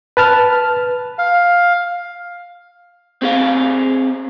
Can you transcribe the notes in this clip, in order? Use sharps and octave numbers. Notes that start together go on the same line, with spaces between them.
B4 A5 F6
F5
C4 G#4 F5